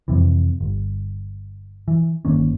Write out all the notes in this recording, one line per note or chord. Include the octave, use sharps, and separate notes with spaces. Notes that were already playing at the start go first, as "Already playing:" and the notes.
F2 C3 E3
G1
E3
G1 D#3 A#3 C#4